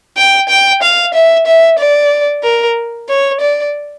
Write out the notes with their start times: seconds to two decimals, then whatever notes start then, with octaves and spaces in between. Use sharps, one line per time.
0.17 G5
0.49 G5
0.83 F5
1.14 E5
1.46 E5
1.79 D5
2.44 A#4
3.09 C#5
3.41 D5